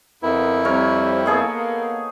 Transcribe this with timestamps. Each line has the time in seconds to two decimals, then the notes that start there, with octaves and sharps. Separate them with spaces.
0.23 F2 C#3 B3 E4 A#4
0.65 G3 C4 A#4 C#5
1.26 A#3 B3 D#4 G#4 A4